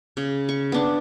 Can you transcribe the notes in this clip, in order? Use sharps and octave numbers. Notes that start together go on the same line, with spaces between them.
C#3
C#6
B3 D4